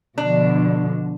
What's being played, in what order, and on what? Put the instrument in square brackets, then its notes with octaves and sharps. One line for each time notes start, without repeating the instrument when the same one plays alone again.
[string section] B2 D3 F3 [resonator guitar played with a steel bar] D4